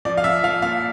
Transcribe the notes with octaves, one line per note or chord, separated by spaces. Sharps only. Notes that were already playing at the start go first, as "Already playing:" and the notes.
F3 D5
F5
F3 E5
F3 F5
A#2 F5